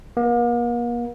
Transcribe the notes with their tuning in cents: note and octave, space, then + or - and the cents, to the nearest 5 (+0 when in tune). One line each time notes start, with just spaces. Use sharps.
A#3 +40